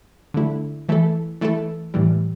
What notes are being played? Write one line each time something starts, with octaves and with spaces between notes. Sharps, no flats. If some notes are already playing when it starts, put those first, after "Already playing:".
D3 A3 E4
E3 A3 E4 A4
E3 A3 E4 A4
A2 E3 G3